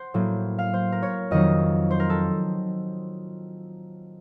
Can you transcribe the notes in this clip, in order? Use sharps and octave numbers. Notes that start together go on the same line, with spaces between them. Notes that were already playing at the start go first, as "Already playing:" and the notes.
Already playing: C5 F#5
A2 F#3 A#3
F5
C5
A#4
C#5
F2 D#3 F#3 D#5
C5
A#4
A4